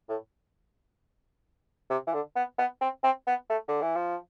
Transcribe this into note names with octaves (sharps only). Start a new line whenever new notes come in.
A2
C3
E3
D3
B3
B3
C4
C4
B3
A3
D3
E3
F3